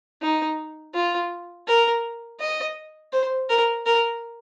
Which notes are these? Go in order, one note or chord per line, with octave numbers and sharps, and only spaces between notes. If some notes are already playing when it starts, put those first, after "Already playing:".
D#4
F4
A#4
D#5
C5
A#4
A#4